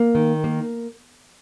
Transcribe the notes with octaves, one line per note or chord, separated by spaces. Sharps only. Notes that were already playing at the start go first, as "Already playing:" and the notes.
Already playing: A#3
D#3
A#3